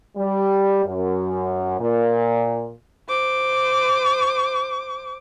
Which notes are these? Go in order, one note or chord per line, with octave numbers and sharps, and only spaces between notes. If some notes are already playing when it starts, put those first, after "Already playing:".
G3
F#2
A#2
C5 D6